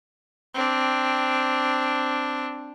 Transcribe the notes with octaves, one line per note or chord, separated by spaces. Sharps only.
C4 D4